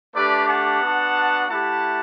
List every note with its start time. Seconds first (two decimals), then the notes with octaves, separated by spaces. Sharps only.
0.15 A3 D4 G4 B4 D5
0.48 F#5 A5
0.82 B3 D4 F#4
1.48 A3 E4 G4 F#5 A5